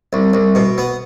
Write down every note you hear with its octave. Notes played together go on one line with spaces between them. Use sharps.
C2
C2
B2
B3